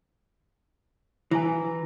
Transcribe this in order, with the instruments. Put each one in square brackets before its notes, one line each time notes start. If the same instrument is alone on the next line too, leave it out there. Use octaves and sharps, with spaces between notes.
[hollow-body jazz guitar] E3 [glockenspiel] G#5 A#5 A#6